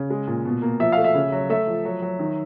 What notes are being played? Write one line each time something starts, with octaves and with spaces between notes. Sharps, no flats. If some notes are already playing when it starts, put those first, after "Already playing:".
Already playing: C#3
G#3
A#2
B2
A#3
F3 E5
A3 F5
E5
C#3
F#3
A3 E5
F3
F#3
F#3
D#3